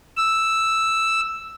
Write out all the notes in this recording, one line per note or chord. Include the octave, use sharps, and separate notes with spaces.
E6